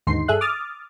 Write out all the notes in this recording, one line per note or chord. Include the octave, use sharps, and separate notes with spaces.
D#2 G#2 D3 D#4 C6 C7
G2 G#4 A4 E5 F#6
D6 D#6 F6 A6